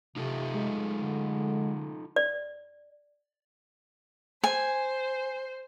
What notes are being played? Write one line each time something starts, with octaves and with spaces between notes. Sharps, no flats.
C3 D#4 F4 A4
G#3
D3
D5
C5 G#5